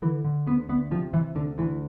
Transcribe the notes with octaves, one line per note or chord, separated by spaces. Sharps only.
D3 E3
D3
D2 B3
D2 B3
C3 F3
C3 E3
D2 D3
D2 E3